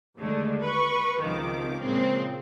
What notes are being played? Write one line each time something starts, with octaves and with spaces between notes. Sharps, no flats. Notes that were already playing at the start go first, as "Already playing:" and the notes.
D#2 D3 G#3 A3
B4 C#6
C#2 C3 D#3 F3 D6
A#2 C#3 F3 G#3 C4